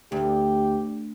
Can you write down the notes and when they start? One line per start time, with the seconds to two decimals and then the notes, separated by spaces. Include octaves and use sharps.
0.12 D2 G4